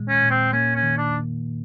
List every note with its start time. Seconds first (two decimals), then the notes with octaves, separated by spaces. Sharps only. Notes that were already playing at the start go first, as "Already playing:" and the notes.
Already playing: A#2 D#3 G#3
0.09 C#4
0.23 A#2
0.30 C4
0.53 A#3 C#4
0.75 C#4
0.83 D#3
0.98 D4